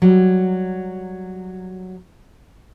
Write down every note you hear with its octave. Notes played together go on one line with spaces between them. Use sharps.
F#3 G3